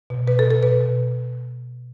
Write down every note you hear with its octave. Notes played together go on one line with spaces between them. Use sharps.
B2
B2 B4
A4
B2
A4
B2 B4
B2